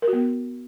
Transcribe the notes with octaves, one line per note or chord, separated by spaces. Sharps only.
A#4
F#4
B3